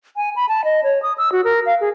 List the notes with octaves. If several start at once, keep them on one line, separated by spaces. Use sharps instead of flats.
G#5
B5
A5
D#5
C#5
D#6
E6
F#4
A#4
F5
G#4